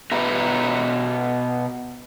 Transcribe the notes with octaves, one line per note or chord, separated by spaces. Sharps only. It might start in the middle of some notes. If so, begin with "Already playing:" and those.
B2 B4 E5 A#5